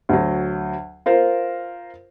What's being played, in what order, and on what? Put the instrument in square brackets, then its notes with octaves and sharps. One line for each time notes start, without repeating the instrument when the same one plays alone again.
[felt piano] D2 F#3
F4 A#4 C5